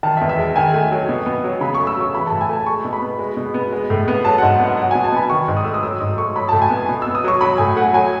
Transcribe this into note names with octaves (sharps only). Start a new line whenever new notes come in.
D#3 A5
E5
E2
E5
G#3
D#3 G#5
A3
F#3
B2
B3
F#3
C#3 B5
C#6
A3
E6
F#3 C#6
E3 B5
A5
A2
G#5
A3 A5
G#3 C#6
B2
B5
B3
G#3
B2
B3
G#3
A2
B3
F#3 A5
G#2 F#5
B3 F#5
F#3 F#5
G#5
B2
A5
B3 B5
D#3 C#6
G#2
D#6
A3 E6
D#6
F#3 E6
G#2 D#6
A3 C#6
F#3 B5
A2 A5
G#5
B3
B2
B3 E6
D#6
F#3 C#6
F#3 B5
A2 G#5
A3 F#5
F#3 G#5